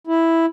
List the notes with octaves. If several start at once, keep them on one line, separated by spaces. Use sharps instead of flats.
E4